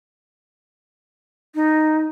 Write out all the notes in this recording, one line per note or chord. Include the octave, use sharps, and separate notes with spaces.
D#4